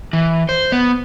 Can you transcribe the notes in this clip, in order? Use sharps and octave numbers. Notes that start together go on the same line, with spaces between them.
E3
C5
B3